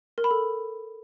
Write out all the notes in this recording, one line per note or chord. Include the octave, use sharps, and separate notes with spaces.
A#4
B5
A4